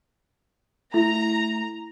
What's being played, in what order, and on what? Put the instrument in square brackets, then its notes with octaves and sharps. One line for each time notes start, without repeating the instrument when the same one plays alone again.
[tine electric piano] A3 [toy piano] E4 [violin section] A#5